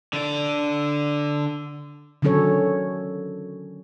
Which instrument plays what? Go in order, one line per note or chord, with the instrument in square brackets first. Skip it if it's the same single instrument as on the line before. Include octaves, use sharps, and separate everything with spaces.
[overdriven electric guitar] D3 D5
[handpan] D3 D#3 F#3 C#4 A4 C#5